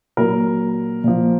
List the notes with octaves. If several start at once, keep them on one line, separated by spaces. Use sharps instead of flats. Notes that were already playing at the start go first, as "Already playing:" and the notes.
A#2 F#3 A#4
A#2 F3